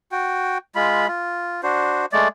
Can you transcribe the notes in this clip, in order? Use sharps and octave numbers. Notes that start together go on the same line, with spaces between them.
F#4 G5
G#3 F4 B5
F4
D4 F#4 C5
G#3 A3 D5